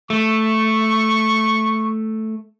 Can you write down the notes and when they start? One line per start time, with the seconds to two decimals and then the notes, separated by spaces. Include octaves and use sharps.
0.10 A3 C#6